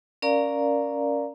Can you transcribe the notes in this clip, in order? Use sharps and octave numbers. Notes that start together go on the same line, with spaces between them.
C#4 A#4 D5 F5 A#5